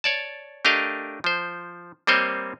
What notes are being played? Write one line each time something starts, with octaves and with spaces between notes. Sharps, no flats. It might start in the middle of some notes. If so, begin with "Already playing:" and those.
C#5 D5 A5
A3 D4 G4 A#4 D#5 F5
F3 C5
G3 A#3 C4 C5 C#5 D#5